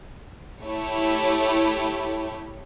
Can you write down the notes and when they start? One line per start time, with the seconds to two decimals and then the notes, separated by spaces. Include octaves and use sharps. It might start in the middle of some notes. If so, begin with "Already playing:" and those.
0.62 A3 E4 G4 C#5